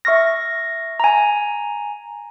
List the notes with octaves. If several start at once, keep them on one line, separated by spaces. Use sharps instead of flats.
E5 C#6 F6 A#6
G#5 A#5